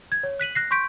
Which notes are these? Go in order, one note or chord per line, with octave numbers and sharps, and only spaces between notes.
G#6
C#5
F#6 B6 D#7 F#7
F#6 A#6 C7
C6 C#6 G6 B6 D7